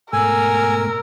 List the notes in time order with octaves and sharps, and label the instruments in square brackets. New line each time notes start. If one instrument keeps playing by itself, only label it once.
[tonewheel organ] G#2 B2 A3 [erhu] A#4 [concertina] G#5 [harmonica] E6